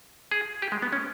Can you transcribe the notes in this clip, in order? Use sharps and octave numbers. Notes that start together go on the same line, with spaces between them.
G#4
G4
G#3
B3
C#4